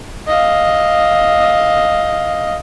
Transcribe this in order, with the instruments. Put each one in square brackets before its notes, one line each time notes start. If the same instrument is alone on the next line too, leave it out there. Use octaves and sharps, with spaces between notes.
[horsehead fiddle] D#5 F5